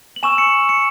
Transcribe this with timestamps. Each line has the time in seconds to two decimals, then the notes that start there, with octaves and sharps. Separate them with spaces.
0.16 F#7
0.23 G#5 C#6 E6 E7
0.38 C#7
0.69 C#7